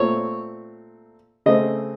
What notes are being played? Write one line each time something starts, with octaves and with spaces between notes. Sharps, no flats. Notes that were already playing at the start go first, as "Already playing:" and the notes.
Already playing: A#2 A3 C4 C#5
C#3 A3 C4 D#5